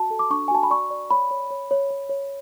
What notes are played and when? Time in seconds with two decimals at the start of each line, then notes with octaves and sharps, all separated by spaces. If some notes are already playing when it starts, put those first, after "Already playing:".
Already playing: F#4 A5
0.10 A4
0.19 D6
0.30 D4 C#6
0.48 G#5
0.51 F#4 A5
0.63 B5
0.70 D5 C#6
0.91 D5
1.11 C#5 B5
1.31 C#5
1.51 C#5
1.71 C#5
1.90 C#5
2.09 C#5